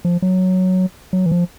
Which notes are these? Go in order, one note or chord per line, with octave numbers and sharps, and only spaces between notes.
F3
F#3
F#3
E3
F3